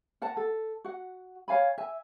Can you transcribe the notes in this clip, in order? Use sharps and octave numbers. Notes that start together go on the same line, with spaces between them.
A#4 F#5 A5
A4
F#4 F#5
C#5 F5 G#5 B5
E5 G#5